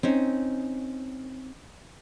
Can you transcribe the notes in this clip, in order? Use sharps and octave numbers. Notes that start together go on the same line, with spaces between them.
C4 C#4 D#4